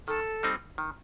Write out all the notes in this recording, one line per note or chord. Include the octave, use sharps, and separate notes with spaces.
D#3 A4
G3 C4 D#4
D#3